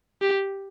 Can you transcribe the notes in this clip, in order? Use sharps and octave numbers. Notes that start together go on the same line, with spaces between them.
G4